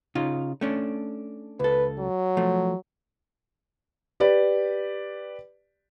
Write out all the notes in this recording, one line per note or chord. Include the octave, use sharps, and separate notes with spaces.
C#3 D#4 F4
A3 C#4 D4
C#2 A4 B4
F#3
F3 A3
G4 B4 D5